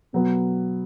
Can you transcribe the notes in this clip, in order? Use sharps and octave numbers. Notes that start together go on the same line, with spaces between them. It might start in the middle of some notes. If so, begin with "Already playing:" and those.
B2 F#3 B3